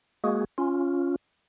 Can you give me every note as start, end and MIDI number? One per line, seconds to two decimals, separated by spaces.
0.24 0.45 56
0.24 0.45 58
0.24 0.45 66
0.24 0.45 68
0.58 1.16 61
0.58 1.16 65